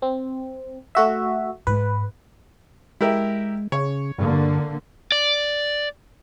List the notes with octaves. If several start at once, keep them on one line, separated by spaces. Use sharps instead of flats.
C4
A3 F#4 E5
G#2 B4
G#3 E4 G4 A#4
C#3 C#5
G2 D3 A#3
D5